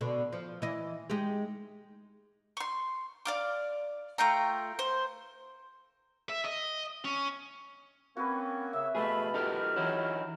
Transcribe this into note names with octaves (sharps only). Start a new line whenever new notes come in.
B2 D3
F3
E3 D#5
G#3 D#4 G4
C6 C#6
D5 F5 D6
A3 F4 G5 A#5
C5
E5
D#5
C#4
A#3 C4 C#4 F#4 B4
C#3 C#5 E5 E6
B2 A3 G#4 F5 A5 B5
D#4 F4 G4 A4 A#4 F6
E3 F#3 D#4 E4